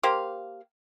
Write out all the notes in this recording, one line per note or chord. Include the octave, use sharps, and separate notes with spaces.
A#3 G4 C5 F5